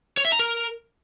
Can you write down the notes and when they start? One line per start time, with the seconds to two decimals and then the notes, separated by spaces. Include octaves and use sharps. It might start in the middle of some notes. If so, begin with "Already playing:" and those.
0.17 C#5
0.25 E5
0.32 A#5
0.39 A#4